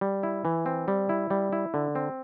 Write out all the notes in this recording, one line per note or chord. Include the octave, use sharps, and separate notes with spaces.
G3
E4
E3
C4
G3
E4
G3
E4
D3
C4